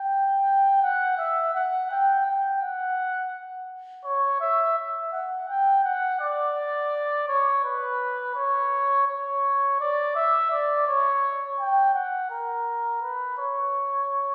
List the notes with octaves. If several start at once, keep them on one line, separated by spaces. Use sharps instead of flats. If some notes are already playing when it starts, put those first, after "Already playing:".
Already playing: G5
F#5
E5
F#5
G5
G5
F#5
C#5
E5
E5
F#5
G5
F#5
D5
C#5
B4
C#5
C#5
D5
E5
D5
C#5
G5
F#5
A#4
B4
C#5